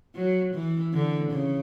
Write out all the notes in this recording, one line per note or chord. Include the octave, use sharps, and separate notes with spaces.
F#3
E3
D3
C#3